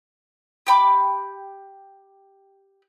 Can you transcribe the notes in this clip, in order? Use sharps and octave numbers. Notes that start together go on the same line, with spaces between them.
G4 G5 B5 D6